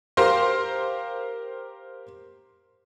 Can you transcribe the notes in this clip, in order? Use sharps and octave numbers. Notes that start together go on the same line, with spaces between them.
G4 A#4 C5 F5 C6